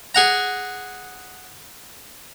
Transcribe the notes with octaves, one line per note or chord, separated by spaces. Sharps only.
G#4 F#5 A#5